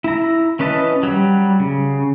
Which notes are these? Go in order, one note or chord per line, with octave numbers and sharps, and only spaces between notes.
E4 A#5
E3 C#4 B4 D#5 A5
F#3 G3
C#3